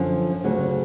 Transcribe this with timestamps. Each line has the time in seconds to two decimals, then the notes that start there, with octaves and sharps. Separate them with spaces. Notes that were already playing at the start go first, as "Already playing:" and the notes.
Already playing: F#2 D3 F3 C#4
0.44 D2 C#3 F#3